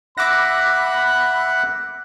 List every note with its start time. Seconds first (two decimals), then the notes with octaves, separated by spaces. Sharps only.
0.18 E5 F#5 B5 D6 E6 F#6 A#6